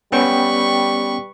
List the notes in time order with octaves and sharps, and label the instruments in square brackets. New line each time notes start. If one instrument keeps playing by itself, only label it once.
[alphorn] G3 [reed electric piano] B3 C#4 G5 [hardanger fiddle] B4 C#6